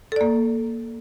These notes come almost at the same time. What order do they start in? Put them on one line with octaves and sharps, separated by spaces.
A4 D5 A#3